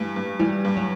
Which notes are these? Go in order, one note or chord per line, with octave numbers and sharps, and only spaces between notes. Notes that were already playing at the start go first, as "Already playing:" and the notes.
Already playing: G2 E3 A3
G2
E3 G3
G2
F#3